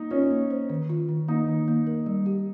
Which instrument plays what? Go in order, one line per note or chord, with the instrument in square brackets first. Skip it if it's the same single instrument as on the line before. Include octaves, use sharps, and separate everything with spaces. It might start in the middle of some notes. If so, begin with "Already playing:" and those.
Already playing: [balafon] A#3 [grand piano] D#4
[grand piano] C#4 [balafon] F4
[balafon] A#3
C5
D#3
F4
D#3
[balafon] A#3 [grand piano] D#4
[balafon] D#3
A#3
A#4
G3
G4